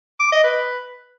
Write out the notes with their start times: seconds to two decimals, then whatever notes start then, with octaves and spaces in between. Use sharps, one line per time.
0.20 D6
0.32 D#5
0.44 B4